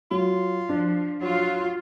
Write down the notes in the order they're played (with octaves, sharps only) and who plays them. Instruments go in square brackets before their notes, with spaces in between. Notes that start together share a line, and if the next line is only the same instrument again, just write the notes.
[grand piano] F#3 [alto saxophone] F4
[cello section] F3 [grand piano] D4
[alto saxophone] F#3 [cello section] F4